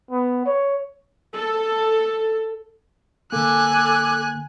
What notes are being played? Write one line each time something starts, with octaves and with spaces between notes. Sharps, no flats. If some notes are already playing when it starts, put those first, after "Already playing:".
B3
C#5
A4
D3 A#3 A4 G#5 D6 F#6